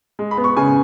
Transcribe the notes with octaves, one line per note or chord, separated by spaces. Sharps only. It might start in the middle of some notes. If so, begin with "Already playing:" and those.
G#3
B5
B3
C#6
C#3 G#5